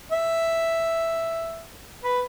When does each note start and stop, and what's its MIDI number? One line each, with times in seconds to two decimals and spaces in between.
0.12 1.65 76
2.04 2.20 71